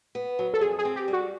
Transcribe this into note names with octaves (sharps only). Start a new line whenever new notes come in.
B3
F#3
A4
F2 G#4
G#4
C4
G4
G3
F#4